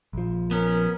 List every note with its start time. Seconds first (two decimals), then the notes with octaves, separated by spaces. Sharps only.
0.13 A#1 F3
0.51 B3 C#4 A#4